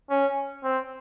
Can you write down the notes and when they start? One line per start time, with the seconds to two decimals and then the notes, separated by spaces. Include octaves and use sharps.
0.10 C#4
0.64 C4